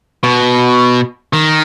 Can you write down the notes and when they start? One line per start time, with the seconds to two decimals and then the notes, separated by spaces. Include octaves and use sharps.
0.23 B2
1.33 D#3